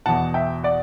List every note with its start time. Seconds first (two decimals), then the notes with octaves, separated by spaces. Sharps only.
0.06 E2 B2 F#5 A5
0.34 E5 G5
0.63 D5 F#5